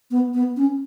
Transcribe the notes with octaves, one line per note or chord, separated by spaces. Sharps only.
B3
B3
C#4